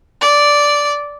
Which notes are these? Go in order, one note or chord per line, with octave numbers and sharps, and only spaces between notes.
D5